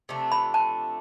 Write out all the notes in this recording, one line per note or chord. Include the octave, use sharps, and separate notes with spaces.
C3 F3 A3 D4
B5
A5